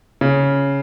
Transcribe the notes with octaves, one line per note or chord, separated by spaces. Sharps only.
C#3